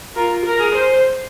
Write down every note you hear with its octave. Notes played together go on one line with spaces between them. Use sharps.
F4 A#4
A#4
G#4
C5